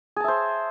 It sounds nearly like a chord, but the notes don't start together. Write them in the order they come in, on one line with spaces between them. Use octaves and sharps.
G#4 A5 E5 C5